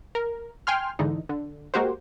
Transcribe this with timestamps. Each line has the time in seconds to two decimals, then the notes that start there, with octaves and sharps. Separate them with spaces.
0.15 A#4
0.67 G5 G#5 C6 F6
0.99 G#2 D3 E3 D#4
1.29 D3
1.74 G#3 A#3 F#4 G4 C5